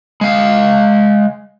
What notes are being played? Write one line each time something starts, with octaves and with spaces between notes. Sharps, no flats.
G#3 F5